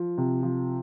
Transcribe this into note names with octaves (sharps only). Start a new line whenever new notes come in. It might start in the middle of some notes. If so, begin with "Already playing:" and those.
Already playing: F3
C3
F3